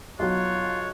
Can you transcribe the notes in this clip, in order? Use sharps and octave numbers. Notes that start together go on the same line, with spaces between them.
B1 F#3 F4 C#5 F#6